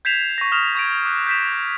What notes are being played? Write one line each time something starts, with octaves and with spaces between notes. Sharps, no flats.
G6 G#6 B6 C7 E7 F7
C#6 A#6
D#6 F6 E7 F7
C#6 G#6 A#6 D7
D6 F#6
G6 B6 E7